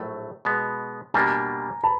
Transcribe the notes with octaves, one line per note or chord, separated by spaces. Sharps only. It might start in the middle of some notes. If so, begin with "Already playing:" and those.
Already playing: A#1 A2 F#3 A3
B2 G#3 B3
B2 G3 A#3 D4 G#5 A#5
A5 B5